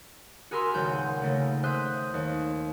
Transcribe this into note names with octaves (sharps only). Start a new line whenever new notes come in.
F#4 G#4 A#4 B5 C6 E6
D#1 C#2 F#5 G6
C#3 A3 A#3
C5 E5 D#6 F#6 G6 B6
D#2